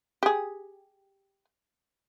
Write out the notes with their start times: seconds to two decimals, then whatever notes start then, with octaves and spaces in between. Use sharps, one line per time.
0.23 G4 G#4